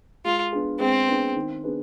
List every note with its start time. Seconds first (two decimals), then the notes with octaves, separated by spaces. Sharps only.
0.25 G#3 F4
0.52 B3 D4 G#4
0.80 G#3 C4
1.08 B3 D4 G#4
1.36 D#3
1.64 B3 D4 G#4 B4